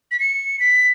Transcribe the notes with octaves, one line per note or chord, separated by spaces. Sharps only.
B6
C#7
B6